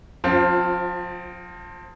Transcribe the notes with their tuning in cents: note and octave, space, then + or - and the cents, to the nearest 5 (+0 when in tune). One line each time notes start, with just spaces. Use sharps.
F3 +35 C4 +10 F4 +0